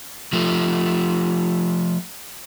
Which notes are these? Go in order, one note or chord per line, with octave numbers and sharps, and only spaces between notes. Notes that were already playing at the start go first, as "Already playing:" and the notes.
F3 A3